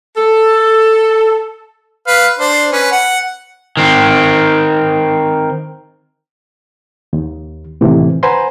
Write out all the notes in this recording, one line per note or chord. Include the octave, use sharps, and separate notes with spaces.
A4
B4 F5
D4 C5
C#4 B4
F#5
D#3 C4
D#2
A2 C3 D#3 E3
B4 C5 F#5 G#5 A#5 C6